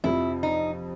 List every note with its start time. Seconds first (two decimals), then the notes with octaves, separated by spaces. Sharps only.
0.04 F2 C3 F3 E4
0.43 D#4